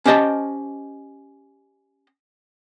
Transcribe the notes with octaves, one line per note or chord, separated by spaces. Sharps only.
C#4 G4 C5 D#5 G5 A5